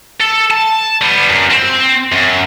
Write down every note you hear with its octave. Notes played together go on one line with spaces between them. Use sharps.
A4
A5
G3 B3
F#2
C4
F#2